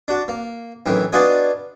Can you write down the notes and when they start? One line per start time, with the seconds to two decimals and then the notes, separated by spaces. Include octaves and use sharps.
0.08 D4 F#4
0.28 A#3
0.86 F#2 A2 D#3 E3
1.12 B3 D4 F4 F#4 D#5 G#5